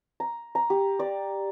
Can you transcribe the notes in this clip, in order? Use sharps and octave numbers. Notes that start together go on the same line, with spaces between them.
A#5
A#5
G4
D5